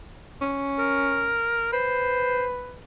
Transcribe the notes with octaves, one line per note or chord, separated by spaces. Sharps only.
C#4
A#4
B4 C5